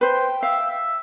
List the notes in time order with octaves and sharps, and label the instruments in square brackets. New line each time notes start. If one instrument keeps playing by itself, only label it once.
[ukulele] B4 C5 [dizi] G5
[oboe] E5 [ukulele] F5
[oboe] E5